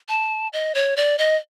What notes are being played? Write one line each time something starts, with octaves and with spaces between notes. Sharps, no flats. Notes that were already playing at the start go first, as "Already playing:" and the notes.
A5
D#5
C#5
D5
D#5